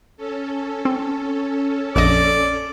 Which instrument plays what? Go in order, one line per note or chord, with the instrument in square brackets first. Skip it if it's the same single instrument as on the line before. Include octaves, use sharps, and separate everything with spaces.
[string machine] C#4 A4
[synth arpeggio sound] C4
[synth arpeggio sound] A#1 F2 D#5 [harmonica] D5